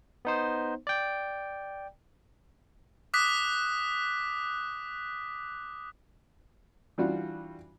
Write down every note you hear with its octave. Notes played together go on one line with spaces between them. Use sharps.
B3 D#4 C5
D5 G5
D6 D#6 F#6 B6
E3 G3 D4 F4 F#4